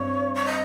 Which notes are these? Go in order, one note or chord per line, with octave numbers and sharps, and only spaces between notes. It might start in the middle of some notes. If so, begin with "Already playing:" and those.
Already playing: G2 C4 C#5
C#5
D#5